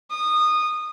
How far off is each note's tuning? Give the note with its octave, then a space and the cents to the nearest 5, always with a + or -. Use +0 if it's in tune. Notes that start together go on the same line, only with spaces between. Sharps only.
D#6 -20